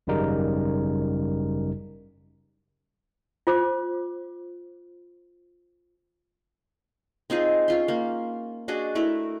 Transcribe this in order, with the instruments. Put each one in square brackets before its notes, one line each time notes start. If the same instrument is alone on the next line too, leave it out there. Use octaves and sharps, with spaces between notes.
[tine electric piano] G#1 F#2 C#3 G3 D#4 A#4
[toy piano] F4 C5 D6
[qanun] C4 D#4 F4 G#4
C#4 F4 C6
A#3
D4 F#4 G#4 D#5
A3 E4 A#4